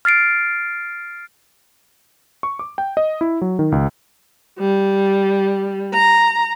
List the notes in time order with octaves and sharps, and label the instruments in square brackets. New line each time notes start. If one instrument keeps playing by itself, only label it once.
[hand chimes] F6 A6 C7 D7
[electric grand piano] C#6
D6
G5
D#5
E4
F#3
D#3
C#2
[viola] G3
A#5